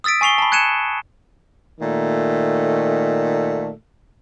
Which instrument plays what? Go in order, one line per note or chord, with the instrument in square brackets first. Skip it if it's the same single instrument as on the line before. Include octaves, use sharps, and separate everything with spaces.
[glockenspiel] D#6 E6 A6 B6 D7
G#5 C#6 C7 F7 G7
A5 B5
F#6 G#6 C#7 D#7 E7
[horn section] A#2 D#3 A3